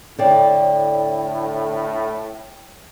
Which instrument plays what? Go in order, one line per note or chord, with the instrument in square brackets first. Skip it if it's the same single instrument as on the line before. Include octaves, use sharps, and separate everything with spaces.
[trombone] A2 [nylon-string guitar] D3 D5 [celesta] C#5 G5